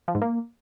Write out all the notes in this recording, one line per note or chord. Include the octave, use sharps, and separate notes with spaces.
F3
G#2
A#3